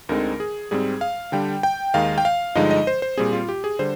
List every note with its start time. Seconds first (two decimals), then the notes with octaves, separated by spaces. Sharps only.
0.09 D2 D3 G#3 C4 D#4 A#4
0.40 G#4
0.71 G#2 G3 C4 G#4
1.01 F5
1.32 D3 G3 D4 G5
1.63 G5
1.94 D#2 D#3 G#3 D#4 F5
2.18 G5
2.25 F5
2.55 G2 D3 F3 G#3 D#4 D#5
2.71 D#5
2.87 C5
3.02 C5
3.17 A#2 G3 C4 G#4
3.33 F4
3.49 G4
3.64 G#4
3.79 D3 G3 C5